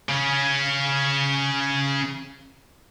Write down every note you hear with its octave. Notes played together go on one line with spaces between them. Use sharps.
C#3 C#4